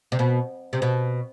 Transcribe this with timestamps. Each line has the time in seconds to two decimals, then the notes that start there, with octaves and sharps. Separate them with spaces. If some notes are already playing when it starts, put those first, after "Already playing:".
0.12 C3
0.19 B2
0.73 C3
0.82 B2